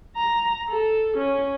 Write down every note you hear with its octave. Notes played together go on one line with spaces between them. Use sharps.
A#5
A4
C#4